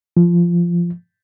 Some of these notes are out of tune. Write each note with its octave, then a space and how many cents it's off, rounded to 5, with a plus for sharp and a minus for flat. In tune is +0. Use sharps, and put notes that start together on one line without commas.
F3 -15